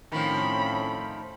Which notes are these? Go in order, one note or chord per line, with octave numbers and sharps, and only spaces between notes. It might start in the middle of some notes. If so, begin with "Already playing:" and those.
A2 D#3 F3 A3 C4 C#4 B5